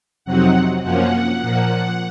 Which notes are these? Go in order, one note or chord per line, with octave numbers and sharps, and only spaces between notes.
F2 C3 F#3 C4 D#4 F#5
F#2 F3 A#3 C#4 F#5
A#2 F3 A#3